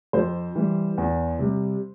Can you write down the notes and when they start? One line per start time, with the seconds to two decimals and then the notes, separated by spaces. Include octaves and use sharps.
0.13 F2 C5
0.55 E3 G3
0.98 E2
1.39 C3 G3